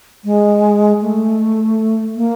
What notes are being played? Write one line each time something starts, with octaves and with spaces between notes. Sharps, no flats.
G#3
A3
A#3